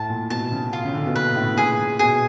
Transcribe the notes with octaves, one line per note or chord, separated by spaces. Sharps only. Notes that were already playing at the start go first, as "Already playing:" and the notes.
Already playing: A2 A5
A#2
B2 A5
C#3
F4
C#3
D3
B2
A#2 B4
A2
A#2 G#4
A#2
B2 G#4